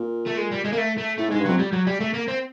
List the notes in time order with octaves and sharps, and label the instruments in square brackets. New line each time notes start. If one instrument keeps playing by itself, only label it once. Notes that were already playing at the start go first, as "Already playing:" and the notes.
Already playing: [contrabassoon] A#2
[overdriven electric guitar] A3
G#3
G3
G#3
A#3
A3
A3
[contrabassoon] A2 [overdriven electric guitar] A3
[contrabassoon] G#2
[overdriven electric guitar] G#3
[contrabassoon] G2
[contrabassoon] F2 [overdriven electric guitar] F#3
[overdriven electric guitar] G3
F#3
G3
A3
A#3
C4